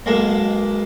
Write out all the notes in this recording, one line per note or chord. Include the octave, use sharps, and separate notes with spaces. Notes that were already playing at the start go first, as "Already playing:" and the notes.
B1 G#3 A#3 A5